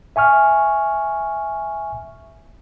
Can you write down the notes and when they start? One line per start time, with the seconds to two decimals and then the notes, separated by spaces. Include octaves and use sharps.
0.16 E5 G#5 C#6 F6